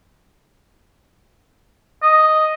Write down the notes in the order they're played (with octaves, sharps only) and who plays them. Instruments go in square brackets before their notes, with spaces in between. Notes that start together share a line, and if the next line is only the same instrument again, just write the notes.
[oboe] D#5